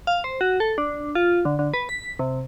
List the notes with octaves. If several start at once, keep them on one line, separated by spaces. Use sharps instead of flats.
F5
C5
F#4
A4
D4
F4
D3
D3
B4
B6
C3